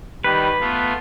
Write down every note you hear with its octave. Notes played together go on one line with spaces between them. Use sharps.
D#3 G3 B4
A3 B3 F4